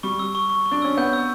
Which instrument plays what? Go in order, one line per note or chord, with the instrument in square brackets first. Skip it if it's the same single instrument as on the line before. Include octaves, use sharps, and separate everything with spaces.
[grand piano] G3 [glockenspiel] C#6
[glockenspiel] E6
C#6
C#6
C#6
[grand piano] D4
[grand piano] C#4 [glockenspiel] E6
[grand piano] B3 [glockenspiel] G6
[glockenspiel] E6